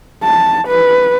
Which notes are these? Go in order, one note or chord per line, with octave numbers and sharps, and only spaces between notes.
A5
B4